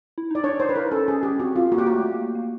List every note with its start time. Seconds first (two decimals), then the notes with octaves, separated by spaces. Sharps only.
0.18 E4
0.31 D#4 D5
0.43 D4 C#5
0.60 D#4 C5
0.69 B4
0.76 E4 A#4
0.91 C#4 A4
1.08 C#4 G#4
1.23 G4
1.39 C4 F#4
1.56 F4
1.72 A#3 F#4
1.78 G4
1.87 F#4
1.93 A3
2.14 A#3
2.35 A#3